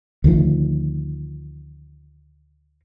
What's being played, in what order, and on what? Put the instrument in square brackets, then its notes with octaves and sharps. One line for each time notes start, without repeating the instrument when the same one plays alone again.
[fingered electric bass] D2 D#3 F3